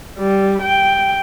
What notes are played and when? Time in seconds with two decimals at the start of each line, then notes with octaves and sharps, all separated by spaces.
0.18 G3
0.62 G5